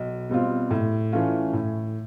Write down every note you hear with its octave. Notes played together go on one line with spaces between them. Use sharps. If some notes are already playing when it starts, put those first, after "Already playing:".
Already playing: B1
B2 G3 C4 F4
A2
E3 A3 C#4 F4
A2